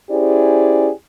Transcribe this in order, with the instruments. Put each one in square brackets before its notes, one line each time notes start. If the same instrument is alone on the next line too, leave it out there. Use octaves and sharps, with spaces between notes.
[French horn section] C#4 E4 G4 G#4 C5 D5